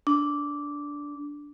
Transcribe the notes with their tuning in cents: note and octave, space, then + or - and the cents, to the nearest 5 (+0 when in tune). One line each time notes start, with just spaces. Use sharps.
D4 -10